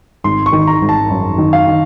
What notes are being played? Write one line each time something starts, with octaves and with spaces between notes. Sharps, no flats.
G#1 C6
C#6
D#3
A#5
G#1
A5
F#2
D#3
F5
D#3